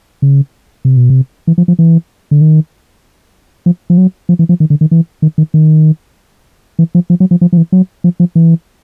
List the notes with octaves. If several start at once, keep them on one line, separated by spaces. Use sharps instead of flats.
C#3
C3
B2
C3
E3
F3
F3
E3
D3
D#3
F3
F3
F#3
F3
E3
F3
D#3
D3
D#3
E3
D#3
D#3
D#3
E3
F3
F3
F#3
F3
F3
F3
E3
F#3
F3
F3
E3